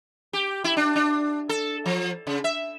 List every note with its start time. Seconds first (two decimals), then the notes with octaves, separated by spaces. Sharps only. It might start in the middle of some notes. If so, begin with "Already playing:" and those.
0.33 G4
0.64 E4
0.77 D4
0.96 D4
1.49 A4
1.86 F3
2.27 C#3
2.44 E5